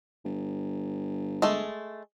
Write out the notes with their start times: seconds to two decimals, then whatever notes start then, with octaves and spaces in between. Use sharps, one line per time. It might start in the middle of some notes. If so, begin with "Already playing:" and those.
0.25 G1
1.42 G#3 A3